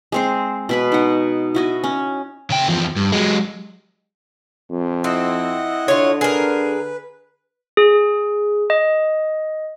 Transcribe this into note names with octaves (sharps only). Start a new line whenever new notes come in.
G#3 C4 C5
B2 B4 B5
D#4 F#5
E4 F#4 D#5
C#4
C#3 G5
E2 F3
G2
F#3 G#3
F2
C4 E4 D#5 F#5
D3 F4 C#5
G#4 A#4 B4
G#4
D#5